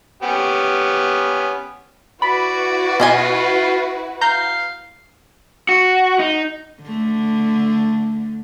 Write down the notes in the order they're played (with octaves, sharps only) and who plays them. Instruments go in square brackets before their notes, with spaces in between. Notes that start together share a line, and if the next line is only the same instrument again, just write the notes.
[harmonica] B3 C#4 G4
[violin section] E4 F#4 B4 [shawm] D5 [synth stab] B5
[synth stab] B2 [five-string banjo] C#4 D#5 G#5 [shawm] F4
[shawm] F5 [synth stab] A#5 G6
[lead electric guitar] F#4
D#4
[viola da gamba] D3 A3